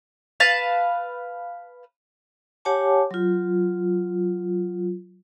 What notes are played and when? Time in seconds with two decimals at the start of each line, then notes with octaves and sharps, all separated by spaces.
0.40 B4 F5 A5
2.65 G4 C#5 F#5 G#5 A5 D6
3.11 F#3 F4